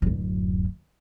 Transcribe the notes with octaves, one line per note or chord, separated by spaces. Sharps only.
D1 F#2